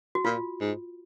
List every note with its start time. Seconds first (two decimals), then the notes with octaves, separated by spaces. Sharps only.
0.15 F#4
0.25 A#2 F4
0.61 G#2